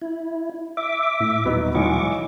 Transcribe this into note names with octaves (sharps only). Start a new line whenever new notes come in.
E4
E5 D6
A2
D#1 F#3 B3 D#4
B1 E3 G#3 C#6 D6